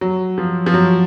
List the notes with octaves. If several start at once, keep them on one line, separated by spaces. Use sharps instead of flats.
F#3
F3
F3
F#3